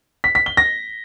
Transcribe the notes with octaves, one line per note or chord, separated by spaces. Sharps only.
B6
B6
G7
A#6